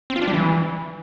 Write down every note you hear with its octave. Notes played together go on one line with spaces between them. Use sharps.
C4
F4
D4
G3
E3